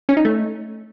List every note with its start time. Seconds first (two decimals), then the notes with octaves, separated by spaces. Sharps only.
0.09 C#4
0.17 D#4
0.25 A3